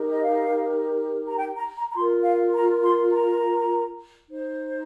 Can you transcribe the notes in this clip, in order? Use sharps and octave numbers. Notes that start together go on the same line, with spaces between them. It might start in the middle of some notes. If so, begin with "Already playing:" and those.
Already playing: D#4 G4 A#4
D#5
F5
A#5
G5
A#5
A#5
A#5
F4 A#4 C6
F5
A#5
C6
A#5
D#4 C5